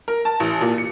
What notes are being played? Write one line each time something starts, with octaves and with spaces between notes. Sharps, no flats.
A#4
A5
A1
A#2
C#7